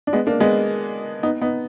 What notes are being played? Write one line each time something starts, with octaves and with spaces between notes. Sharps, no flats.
D4
G#3 B3
A#3 D4
G#3 B3
B3 D#4
B3 D#4